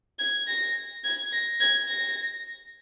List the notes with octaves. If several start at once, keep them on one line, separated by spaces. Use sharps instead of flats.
G#6
A#6
G#6
A#6
G#6
A#6